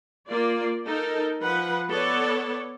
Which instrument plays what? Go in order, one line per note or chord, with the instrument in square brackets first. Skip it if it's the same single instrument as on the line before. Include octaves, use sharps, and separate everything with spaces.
[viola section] A#3 F4 D5
D#4 A4 A#4
F3 B4 F#5
B3 A4 C#5 D5